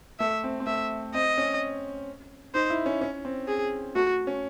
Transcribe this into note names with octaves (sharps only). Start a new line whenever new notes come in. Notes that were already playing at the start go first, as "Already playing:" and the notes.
A3 E5
C4
C4
A3 E5
C4 D#5
C#4
D#4 C5
E4
C#4
C#4
C4
G#4
A3 F#4
C#4